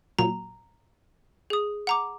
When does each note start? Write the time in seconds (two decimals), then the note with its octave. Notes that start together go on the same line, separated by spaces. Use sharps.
0.19 A#2 F#3 A#5
1.50 G#4 D#6
1.87 F#5 A#5 D6